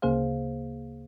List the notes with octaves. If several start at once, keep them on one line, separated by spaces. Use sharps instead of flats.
D2 C#3 A#3 G#4 C5 F5